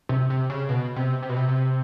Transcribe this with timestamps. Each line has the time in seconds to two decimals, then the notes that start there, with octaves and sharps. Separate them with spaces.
0.09 C3
0.30 C3
0.50 C#3
0.69 B2
0.96 C3
1.23 C3
1.29 B2
1.37 C3
1.48 C3